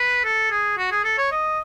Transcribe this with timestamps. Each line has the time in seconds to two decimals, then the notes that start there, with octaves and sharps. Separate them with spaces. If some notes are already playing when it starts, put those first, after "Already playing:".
Already playing: B4
0.24 A4
0.51 G#4
0.78 F#4
0.91 G#4
1.04 A4
1.18 C#5
1.32 D#5